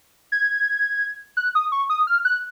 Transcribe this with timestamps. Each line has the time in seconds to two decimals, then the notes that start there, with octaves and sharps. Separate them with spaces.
0.32 G#6
1.37 F#6
1.55 D#6
1.72 C#6
1.90 D#6
2.07 F6
2.25 F#6